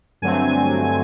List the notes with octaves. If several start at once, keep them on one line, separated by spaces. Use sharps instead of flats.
G2 D3 F#3 A3 C4 G#5